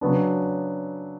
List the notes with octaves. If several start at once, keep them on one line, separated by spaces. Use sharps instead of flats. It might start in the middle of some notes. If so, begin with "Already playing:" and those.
C#3 F#3 B3 D4